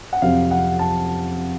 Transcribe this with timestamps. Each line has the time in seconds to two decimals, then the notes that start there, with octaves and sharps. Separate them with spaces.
0.13 F#5
0.22 F2 C3 F#3 C4 F5
0.51 F#5
0.79 A5